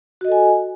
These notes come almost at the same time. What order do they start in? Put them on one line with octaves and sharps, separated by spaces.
F#4 D#5 A4 G#5